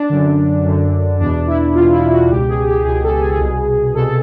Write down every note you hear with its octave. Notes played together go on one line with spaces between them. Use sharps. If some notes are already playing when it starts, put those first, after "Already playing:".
Already playing: D4
F#2 D3
F#2 D3
E2 B2 D4
E4
E2 B2 F4
E4
F#4
C#2 B2 G4
G#4
G4
C#2 B2 G#4
A4
G#4
C2 B2
C2 B2 A4